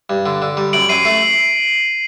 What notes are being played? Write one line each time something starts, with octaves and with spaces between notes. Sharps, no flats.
G2
D3
D3
G3
F#2 D7 F#7
F#2 C7 D#7
A3 C7